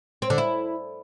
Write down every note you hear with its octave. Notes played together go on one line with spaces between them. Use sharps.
C4
D3
E4